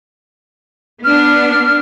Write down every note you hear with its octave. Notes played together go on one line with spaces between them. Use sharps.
B3 D4 F6